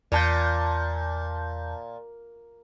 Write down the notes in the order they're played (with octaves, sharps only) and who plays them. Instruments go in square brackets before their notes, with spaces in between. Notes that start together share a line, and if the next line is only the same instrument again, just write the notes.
[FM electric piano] E2 A5 G6 [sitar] A#2